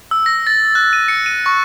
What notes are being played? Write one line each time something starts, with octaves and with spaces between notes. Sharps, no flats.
E6
A#6
A6
F#6
D#7
C#7
D#7
C#6